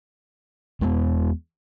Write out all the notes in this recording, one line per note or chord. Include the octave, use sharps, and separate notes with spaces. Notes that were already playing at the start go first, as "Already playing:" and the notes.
E2 G#3 A3 B3